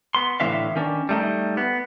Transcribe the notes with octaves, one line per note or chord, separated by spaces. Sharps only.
B3 C6
A2 D3 E3 C#4 E5 F5
D#3 C#4 D4
G3 A3 D#4
B3